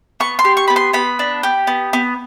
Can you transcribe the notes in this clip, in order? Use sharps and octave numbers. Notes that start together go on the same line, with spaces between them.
B3 C#6
C6
G4
C#6
B3 B5
C6
B3 B5
D4
G4
B3
B3